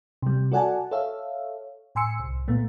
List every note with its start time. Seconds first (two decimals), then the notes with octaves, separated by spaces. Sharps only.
0.22 C3 G3
0.52 F#4 A4 D5 F#5 G#5 A5
0.91 A4 C#5 E5 F5
1.95 A2 G#5 C6 E6 C#7
2.20 C2
2.48 A#2 A3 B3